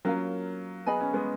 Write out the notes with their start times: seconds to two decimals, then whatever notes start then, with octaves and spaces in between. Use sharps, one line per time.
0.05 F#3 A#3 C#4 F4 A#4 F5
0.86 B3 G#4 D#5 G#5 B5
1.01 C#4
1.14 G#3 B3